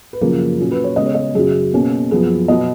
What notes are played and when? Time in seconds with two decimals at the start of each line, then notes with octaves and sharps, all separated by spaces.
0.13 B4
0.21 F#2 C#3 F3 A#3 A#4
0.59 A#2 F#3 C#4
0.71 B4
0.84 C#5
0.96 C#3 G#3 B3 D#5
1.06 C#5
1.15 D#5
1.35 F#2 C#3 F#3 G#4
1.72 B2 A#3 C#4
2.11 F#2 F3 B3 G#4
2.48 B2 F#3 B3 D#5